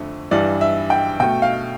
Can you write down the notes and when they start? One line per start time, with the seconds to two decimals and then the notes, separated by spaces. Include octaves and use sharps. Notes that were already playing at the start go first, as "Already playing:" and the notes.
Already playing: F2 D3 A3
0.31 G2 E3 G3 D5
0.61 E5
0.90 G5
1.20 B2 A3 G5
1.42 F5